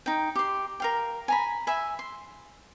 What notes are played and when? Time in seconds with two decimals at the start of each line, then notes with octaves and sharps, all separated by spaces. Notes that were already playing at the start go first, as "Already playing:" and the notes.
0.06 D#4 G5
0.35 G4 C6
0.80 A#4 F5 G5
1.28 G#5 A#5 B5
1.67 E5 G#5 B5
1.99 C6